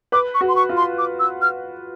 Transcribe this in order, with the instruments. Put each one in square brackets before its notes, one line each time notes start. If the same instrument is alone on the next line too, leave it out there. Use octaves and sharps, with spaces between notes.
[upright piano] B4 [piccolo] D6
[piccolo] C#6
[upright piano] F#4
[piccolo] C6
C#6
[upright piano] F4
[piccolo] C6
D6
E6
F6